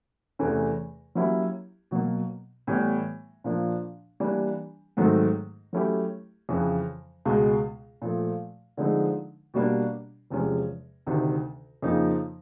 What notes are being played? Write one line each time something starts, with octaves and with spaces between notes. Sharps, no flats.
E2 C3 E3 A3 C#4
F#3 A#3 C#4 E4 G4
B2 F#3 A#3
A2 E3 G3 B3
A#2 F3 A#3 D4
E3 G3 A#3 D4 G4
G#2 D#3 F#3 A3 C4
F#3 A3 C#4 E4 G4
F2 C#3 E3
C#2 B2 G#3
A#2 F3 A3
D3 F3 G#3 C4 D#4
B2 G3 A#3 D4
E2 C3 F3 G#3 C#4
D2 C3 D#3
F2 C#3 F3 A#3 D#4